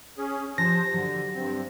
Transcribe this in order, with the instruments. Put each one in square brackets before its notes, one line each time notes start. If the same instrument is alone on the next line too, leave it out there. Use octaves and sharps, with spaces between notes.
[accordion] C#4 G#4
[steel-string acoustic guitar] F3 [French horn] G4 [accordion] C5 A5 [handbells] A#6
[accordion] D3 [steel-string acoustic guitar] F#3
[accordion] G2 C4